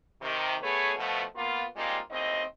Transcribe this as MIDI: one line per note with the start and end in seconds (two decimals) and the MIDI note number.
0.22 0.56 48
0.22 0.56 51
0.62 0.93 57
0.62 0.93 59
0.62 0.93 68
0.62 0.93 71
0.62 0.93 73
0.97 1.23 47
0.97 1.23 53
0.97 1.23 57
1.36 1.65 58
1.36 1.65 59
1.36 1.65 65
1.76 1.99 55
1.76 1.99 56
1.76 1.99 58
1.76 1.99 60
1.76 1.99 63
1.76 1.99 65
2.11 2.44 39
2.11 2.44 45
2.11 2.44 60
2.11 2.44 75